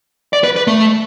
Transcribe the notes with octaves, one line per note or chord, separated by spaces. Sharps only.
D5
B4
B4
A3